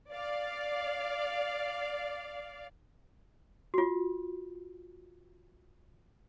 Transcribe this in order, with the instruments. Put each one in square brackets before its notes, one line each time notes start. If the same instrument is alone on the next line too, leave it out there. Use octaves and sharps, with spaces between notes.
[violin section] D5 F5
[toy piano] F4 F#4